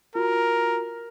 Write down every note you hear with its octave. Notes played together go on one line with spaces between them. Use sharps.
F4 F#4 A#4